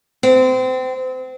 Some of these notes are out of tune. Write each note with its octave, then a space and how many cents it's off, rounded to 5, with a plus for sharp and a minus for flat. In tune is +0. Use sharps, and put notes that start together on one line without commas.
C4 -30